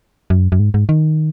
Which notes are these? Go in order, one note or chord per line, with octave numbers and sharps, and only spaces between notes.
F#2
F#2
G#2
G#2
D#3